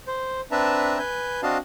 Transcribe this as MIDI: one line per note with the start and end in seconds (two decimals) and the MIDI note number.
0.07 0.41 72
0.51 0.98 60
0.51 0.98 62
0.51 0.98 71
0.51 0.98 76
0.51 0.98 81
0.51 0.98 82
0.98 1.41 71
0.98 1.41 80
0.98 1.41 91
1.43 1.57 60
1.43 1.57 62
1.43 1.57 66
1.43 1.57 75
1.43 1.57 77
1.43 1.57 81